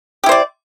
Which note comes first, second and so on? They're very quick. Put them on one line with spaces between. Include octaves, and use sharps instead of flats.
G4 E4 C5 D5